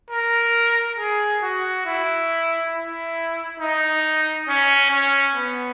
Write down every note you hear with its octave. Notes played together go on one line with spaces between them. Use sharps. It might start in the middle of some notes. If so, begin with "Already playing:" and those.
A#4
G#4
F#4
E4
E4
D#4
C#4
C#4
B3